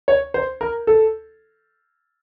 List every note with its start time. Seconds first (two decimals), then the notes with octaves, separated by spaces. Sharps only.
0.08 C#5
0.34 C5
0.61 A#4
0.87 A4